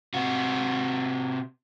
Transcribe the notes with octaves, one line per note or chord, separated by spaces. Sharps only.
C3 F#4